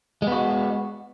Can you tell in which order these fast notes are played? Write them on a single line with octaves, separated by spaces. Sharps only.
G#3 B3 F#4